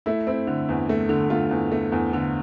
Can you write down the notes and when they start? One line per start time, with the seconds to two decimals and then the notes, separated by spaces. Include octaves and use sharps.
0.06 A3 E4
0.27 C4 E4
0.47 D3
0.69 E2
0.89 A3
1.09 D3
1.30 A3 F4
1.51 E2
1.72 A3
1.92 E2
2.13 D3